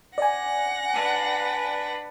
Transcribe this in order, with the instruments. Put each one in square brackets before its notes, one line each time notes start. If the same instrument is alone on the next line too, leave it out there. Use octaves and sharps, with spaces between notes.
[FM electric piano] D5 G#5 [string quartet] F#5 A#6
[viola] D4 B4